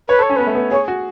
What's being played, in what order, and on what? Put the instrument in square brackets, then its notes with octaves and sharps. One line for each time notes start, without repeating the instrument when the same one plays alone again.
[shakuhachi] B4 [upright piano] C#5
[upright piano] A4 [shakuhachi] C#5
[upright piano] C#4
[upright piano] B3 [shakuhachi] B4
[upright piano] A3
B3
[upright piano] G#4 [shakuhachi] C#5
[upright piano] F#4